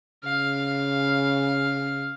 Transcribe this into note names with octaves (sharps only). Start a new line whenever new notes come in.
C#3 F5